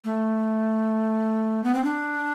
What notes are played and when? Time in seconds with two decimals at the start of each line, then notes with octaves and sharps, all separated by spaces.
0.05 A3
1.64 B3
1.75 C4
1.84 D4